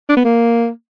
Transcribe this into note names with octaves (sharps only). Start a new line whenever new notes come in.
D4
B3
A#3